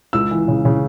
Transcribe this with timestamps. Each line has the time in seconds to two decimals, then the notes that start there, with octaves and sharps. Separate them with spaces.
0.13 C#2 E6
0.31 E3
0.48 C#3
0.65 C#3